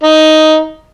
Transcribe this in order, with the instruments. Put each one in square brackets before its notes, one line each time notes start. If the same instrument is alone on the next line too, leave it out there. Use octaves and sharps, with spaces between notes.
[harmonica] D#4